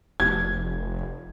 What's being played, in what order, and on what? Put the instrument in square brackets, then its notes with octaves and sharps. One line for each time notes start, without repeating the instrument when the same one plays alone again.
[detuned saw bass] F1 [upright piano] G#6